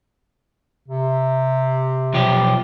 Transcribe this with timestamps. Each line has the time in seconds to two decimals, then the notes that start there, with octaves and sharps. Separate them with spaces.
0.88 C3
2.14 B1 F3 G4